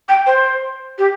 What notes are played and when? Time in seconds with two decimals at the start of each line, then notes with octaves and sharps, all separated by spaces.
0.09 G5
0.27 C5
0.98 G4